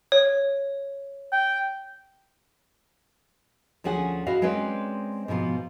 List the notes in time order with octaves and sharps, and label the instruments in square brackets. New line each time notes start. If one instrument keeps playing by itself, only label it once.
[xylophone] C#5
[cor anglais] G5
[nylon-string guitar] D2 F3 C#4 G#4 F#5
E4 F#4 D#5 F5
G#3 C4 C#4 B4 D5
G#2 B2 F3 B3 F5